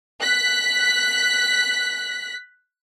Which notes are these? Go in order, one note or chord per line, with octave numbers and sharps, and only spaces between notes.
F#6 B6